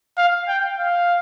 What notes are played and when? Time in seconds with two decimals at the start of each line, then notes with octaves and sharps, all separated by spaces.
0.18 F5
0.48 G5
0.79 F5